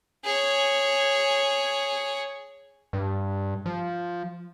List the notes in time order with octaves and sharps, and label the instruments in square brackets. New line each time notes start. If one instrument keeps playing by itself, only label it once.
[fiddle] G#4 C#5
[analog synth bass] G2
F3